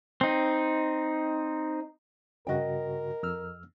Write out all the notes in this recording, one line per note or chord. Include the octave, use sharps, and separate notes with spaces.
C4 D#4
G2 C#3 F#4 A#4 D#5 G5
F2 E6 F6